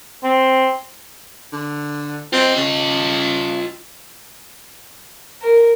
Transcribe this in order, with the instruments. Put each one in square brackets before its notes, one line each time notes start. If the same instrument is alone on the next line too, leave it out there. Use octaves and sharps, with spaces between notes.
[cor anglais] C4
[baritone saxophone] D3
[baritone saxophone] C4 [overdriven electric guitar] F4 D#5
[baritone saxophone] C#3
[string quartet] A#4